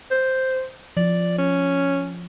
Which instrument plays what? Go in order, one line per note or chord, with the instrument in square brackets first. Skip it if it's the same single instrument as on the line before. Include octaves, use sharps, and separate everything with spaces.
[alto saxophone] C5
[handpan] F3 [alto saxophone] D5
[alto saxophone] C#4